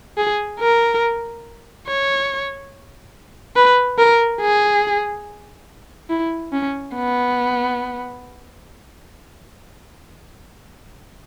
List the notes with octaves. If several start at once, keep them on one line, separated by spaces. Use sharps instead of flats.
G#4
A#4
C#5
B4
A#4
G#4
E4
C#4
B3